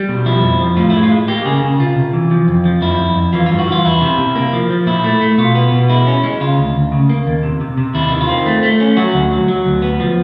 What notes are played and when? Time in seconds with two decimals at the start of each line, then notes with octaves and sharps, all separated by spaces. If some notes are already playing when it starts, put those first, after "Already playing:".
Already playing: G3
0.09 B2
0.26 F3 E4
0.43 F2
0.60 F3
0.76 A2 F4
0.90 E4
0.94 G#3
1.03 F4
1.12 G#3
1.28 A#3 G4
1.45 C#3 G#4
1.63 C#3
1.80 C3 F4
1.96 C3
2.13 E3
2.31 F3
2.48 F2
2.65 F3
2.82 F2 E4
2.99 F2
3.16 F2
3.33 E3 F4
3.46 F4
3.50 G2
3.59 F#4
3.68 E3 F4
3.85 E2 E4
4.01 C3
4.19 C3
4.36 A#3
4.53 F3
4.70 F3
4.87 A#2 E4
5.04 A3
5.21 A3
5.38 B2 F4
5.55 B3
5.72 B2
5.89 G#3 E4
6.07 C#4
6.24 G#3
6.40 C#3 F4
6.58 D2
6.75 D2
6.92 C#3
7.09 A#3
7.27 D#2
7.43 C3
7.61 C3
7.77 C3
7.94 D#2 E4
8.12 D#3
8.21 F4
8.29 C4
8.46 A3
8.63 A3
8.80 C#4
8.97 F#3 F#4
9.14 D2
9.31 F#3
9.48 F#3
9.65 D2
9.82 B3
10.00 F3